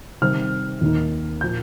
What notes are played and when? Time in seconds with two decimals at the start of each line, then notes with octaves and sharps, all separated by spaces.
0.21 C3 D#3 G3 C4 F6
0.81 D#2 D#3 A#3 D#4
1.41 A#2 F3 G6